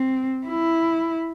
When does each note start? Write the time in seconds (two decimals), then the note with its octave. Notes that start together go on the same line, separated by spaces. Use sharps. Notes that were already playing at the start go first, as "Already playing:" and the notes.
Already playing: C4
0.47 E4